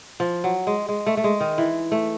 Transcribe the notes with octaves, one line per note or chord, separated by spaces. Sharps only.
F3
F#3
G#3
G#3
A3
A3
G#3
D#3
E3
A3